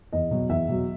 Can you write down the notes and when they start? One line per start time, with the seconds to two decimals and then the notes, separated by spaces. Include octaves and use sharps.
0.13 E2 D#5
0.31 B2 F#3
0.49 E2 E5
0.69 B2 F#3